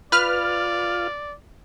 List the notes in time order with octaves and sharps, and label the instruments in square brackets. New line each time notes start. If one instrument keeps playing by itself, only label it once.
[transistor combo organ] F4 [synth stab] B4 F6 [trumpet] D5